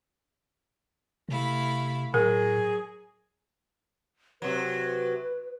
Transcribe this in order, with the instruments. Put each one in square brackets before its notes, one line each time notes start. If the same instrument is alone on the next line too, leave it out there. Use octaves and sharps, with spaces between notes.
[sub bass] C3 [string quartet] A3 E4 F5
[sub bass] A2 [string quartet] F#3 [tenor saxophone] G#4 [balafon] A#4
[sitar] C3 F#3 [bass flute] B4